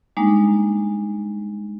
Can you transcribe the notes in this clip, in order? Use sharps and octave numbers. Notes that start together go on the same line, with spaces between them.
G3 G#3 A#3 D4 D#4